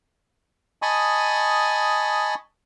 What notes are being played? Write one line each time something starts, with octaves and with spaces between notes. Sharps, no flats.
D#5 G#5 A5 B5 C#6 D#6